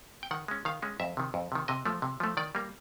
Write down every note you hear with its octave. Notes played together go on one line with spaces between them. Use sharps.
G5
D#3 F#5
G#3 C#4
D#3 F5
G#3 C#4
F2 E5
C3 D#3
F2
C3 D#3
C3 D#5
F3 A3
C3
F3 A3
D#3 D5
G3 A#3